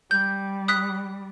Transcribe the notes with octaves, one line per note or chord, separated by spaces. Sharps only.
G3 G6
D#6 F#6 B6